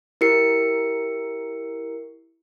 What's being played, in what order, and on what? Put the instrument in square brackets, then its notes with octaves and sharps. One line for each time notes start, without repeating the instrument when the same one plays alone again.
[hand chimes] E4 G4 A#4 C7 C#7